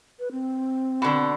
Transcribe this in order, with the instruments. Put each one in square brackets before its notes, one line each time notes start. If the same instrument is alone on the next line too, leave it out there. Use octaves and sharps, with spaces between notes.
[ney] B4
C4
[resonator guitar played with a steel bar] B2 D3